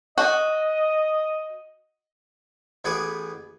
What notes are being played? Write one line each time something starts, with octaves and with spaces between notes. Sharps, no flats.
F#4 D#5
A1 B3 G#4 B5 D6